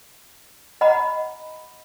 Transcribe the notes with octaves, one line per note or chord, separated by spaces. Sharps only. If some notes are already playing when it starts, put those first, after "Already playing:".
D#5 F#5 A#5 B5